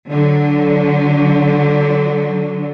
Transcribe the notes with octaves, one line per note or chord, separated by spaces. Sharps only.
D3 F#3